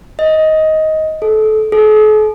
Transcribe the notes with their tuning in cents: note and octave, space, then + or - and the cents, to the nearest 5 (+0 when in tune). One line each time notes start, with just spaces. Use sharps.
D#5 +15
A4 -25
A4 -45